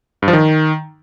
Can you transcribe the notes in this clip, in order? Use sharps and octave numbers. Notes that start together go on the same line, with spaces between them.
G2
F3
D#3